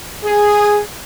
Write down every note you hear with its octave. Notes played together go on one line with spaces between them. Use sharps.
G#4